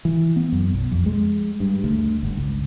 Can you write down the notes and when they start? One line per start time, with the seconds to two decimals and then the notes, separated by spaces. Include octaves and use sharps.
0.05 E3
0.36 B3
0.52 F#2
0.74 B1
0.91 F2
1.06 G#3
1.60 G2
1.84 D2
2.23 G1
2.37 C#2